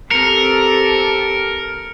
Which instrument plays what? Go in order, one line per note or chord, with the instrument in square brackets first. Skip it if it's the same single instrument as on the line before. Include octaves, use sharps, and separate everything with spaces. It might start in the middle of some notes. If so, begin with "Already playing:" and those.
[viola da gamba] C4 G4 A4 [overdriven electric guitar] A#4 [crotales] C#7